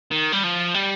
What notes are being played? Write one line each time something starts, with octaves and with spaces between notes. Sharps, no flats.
D#3
G3
F3
G3